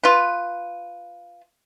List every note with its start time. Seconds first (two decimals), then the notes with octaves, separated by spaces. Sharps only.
0.04 F4 B4